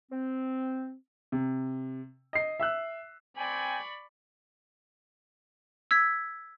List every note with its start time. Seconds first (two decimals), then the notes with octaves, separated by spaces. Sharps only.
0.11 C4
1.32 C3
2.33 D#5 C7
2.60 E5 E6 F#6
3.37 C4 D5 G5 G#5 B5 C#6
5.91 E6 G#6 B6